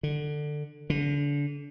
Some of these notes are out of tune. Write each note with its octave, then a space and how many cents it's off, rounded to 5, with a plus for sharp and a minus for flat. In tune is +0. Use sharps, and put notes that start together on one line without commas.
D3 +15
D3 -30